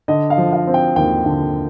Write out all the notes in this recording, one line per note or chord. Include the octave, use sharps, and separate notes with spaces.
D3 D#5
F5
F3
F5
C4
G5
D#2 G5
D3